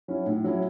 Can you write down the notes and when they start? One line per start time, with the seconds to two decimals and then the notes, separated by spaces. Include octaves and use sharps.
0.08 F#3 C#4 E4
0.26 A2
0.44 F#3 C#4 E4